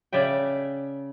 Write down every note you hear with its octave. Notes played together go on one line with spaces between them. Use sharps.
C#3 D5 E5 G5